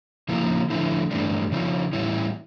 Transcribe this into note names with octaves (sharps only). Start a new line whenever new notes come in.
C#3 F3 A#3 E4
D3 F3 A3 E4
G2 E3 A3 D4
C#3 F3 C#4 E4
A2 E3 G3 C#4 E4